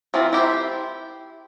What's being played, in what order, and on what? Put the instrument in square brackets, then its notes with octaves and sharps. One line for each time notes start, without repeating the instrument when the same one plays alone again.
[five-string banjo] E3 F3 C4 F4
E4 G4 C5 E5